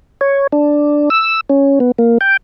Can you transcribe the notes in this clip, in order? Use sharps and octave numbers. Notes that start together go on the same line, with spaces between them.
C#5
D4
E6
C#4
B3
A#3
G5